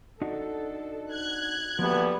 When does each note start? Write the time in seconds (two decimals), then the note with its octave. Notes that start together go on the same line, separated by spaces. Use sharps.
0.22 D4 D#4 F#4 A4
1.10 F#6 G#6
1.79 D2 F3 G3 A#3 B3 F#4